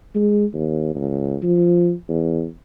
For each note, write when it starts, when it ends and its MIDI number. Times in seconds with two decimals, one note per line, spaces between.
0.15 0.45 56
0.54 0.91 39
0.95 1.37 37
1.43 1.92 53
2.09 2.46 40